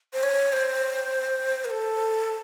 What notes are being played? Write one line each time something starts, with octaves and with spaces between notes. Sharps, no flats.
C5
C#5
C5
A#4
A4